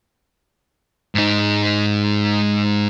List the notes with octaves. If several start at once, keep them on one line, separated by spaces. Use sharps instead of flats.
G#2 D#4